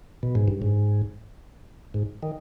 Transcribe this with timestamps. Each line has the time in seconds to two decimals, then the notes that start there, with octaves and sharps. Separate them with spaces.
0.23 B2
0.35 G#2
0.48 G2
0.62 G#2
1.94 G#2
2.23 D#3